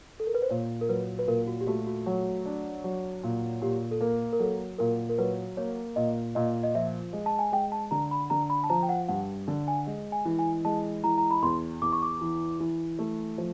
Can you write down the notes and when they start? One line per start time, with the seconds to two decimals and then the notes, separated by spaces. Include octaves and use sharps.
0.20 A4
0.27 A#4
0.34 B4
0.42 C5
0.50 A#2 C#5
0.81 A#4
0.89 F#3 B4
1.19 B4
1.27 A#2 A#4
1.47 F#4
1.61 G4
1.67 A3 F#4
1.87 F#4
2.06 F#3
2.45 D4
2.84 F#3
3.23 A#2
3.61 A#2 G4
3.91 A4
4.00 A#3 A#4
4.33 A#4
4.40 F#3 A4
4.79 A#2 A#4
5.10 A#4
5.18 F#3 B4
5.57 A#3 C#5
5.96 A#2 D#5
6.35 A#2 D#5
6.63 D#5
6.75 F3 E5
7.13 G#3
7.26 A5
7.39 G#5
7.52 G#3 G5
7.72 A5
7.91 D3 A#5
8.11 B5
8.30 D3 A#5
8.50 B5
8.64 A5
8.69 F3 A#5
8.83 G5
8.89 F#5
9.08 G2 F#5
9.48 D3
9.68 G#5
9.87 G#3
10.12 G#5
10.25 E3
10.39 G#5
10.65 G#3 A5
11.04 E3 A#5
11.18 A#5
11.31 B5
11.42 E2 C6
11.82 E2 D6
11.93 C#6
12.02 D6
12.21 E3
12.60 E3
12.99 A3
13.38 F3